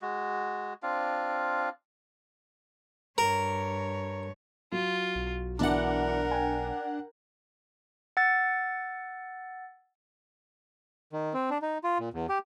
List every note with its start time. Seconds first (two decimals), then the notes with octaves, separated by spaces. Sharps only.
0.02 G#3 F#4
0.83 C4 D4 F4 F5
3.18 G2 A#4 C#5
4.72 F#3 F4
5.15 B1
5.59 B2 E3 D4 A#4 D5 F#5
6.31 G5 G#5
8.17 F#5 E6 A6
11.13 D#3
11.34 C4
11.50 D4
11.62 D#4
11.84 F4
12.00 A#2
12.14 E2
12.29 G4